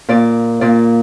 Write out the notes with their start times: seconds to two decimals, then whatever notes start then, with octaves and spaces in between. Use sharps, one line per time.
0.09 A#2 D5
0.61 A#2 D5